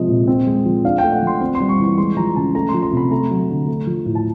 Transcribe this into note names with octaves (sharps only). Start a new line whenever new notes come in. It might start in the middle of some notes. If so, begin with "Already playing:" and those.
Already playing: C3 F3 G#3 D#5
A#2
C4
G#3
F3
D4 F5
A3 G5
F#5
F3 C6
C4 C6
C6
G3
C#6
E3 C#6
G#3 C6
F3 A#5
C#3 A5
A3 A#5
C6
F3
C6
C3 B5
A3 A#5
F#3
D3
A3
F3
A2
A5